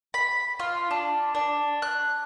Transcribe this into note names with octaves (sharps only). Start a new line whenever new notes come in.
B5
F4
D4
D4
F#6